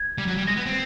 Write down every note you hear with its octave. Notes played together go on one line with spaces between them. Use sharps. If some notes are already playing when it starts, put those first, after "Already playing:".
Already playing: G#6
G3
F#3
G3
G#3 A#6
B3
C4